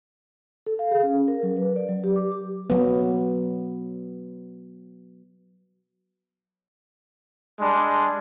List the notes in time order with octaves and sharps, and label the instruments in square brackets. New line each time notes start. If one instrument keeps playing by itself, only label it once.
[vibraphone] A4
F5
G#4
C#4
A#4
F#3
B4
D5
F#3
G4
D6
G4
[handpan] F#3 B3
[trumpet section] G3 G#3 D4